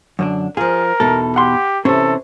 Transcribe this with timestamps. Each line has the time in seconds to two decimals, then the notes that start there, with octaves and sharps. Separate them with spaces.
0.19 F#2 D3 D4
0.57 F3 F4 G#4 A#4
1.00 E2 B2 D#4 A4
1.36 G4 F#5 C6
1.85 C3 E3 C#4 A4 C5